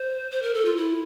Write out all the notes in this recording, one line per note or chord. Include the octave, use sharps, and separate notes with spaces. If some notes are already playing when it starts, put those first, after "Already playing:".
Already playing: C5
C5
A#4
A4
F4
E4